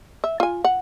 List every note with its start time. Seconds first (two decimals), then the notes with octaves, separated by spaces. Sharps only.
0.24 E5
0.40 F4 G#5
0.65 F#5